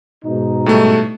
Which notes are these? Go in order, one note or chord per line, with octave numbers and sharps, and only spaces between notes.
G#2 B2 D#4
A2 G3 A3